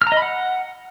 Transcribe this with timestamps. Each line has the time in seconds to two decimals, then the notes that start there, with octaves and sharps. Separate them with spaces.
0.02 F6
0.07 A#5
0.12 D#5
0.17 B5
0.22 F#5